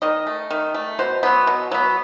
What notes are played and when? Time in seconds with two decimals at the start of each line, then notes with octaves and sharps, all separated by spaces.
0.02 D#3 D#5
0.27 A3
0.51 D#3
0.74 A3
0.99 B2 C5
1.23 F#3 B3
1.47 B2
1.72 F#3 B3